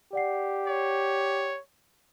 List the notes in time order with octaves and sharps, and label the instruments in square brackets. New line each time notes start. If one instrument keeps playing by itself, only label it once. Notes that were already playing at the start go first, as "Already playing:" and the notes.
[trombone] G4 [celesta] D5 F#5 C7
[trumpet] C#5